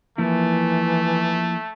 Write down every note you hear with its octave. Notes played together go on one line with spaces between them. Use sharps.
E3 F3 A3 A#3 E4